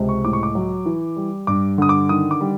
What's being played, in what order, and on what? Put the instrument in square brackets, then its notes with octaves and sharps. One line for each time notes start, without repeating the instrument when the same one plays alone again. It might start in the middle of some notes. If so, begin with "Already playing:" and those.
Already playing: [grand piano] C#2 C3
C#6
A2 D6
C#6
D6
F#3
E3
G3
G2 D6
D3 D#6
D6
D#3 D#6
D6
G3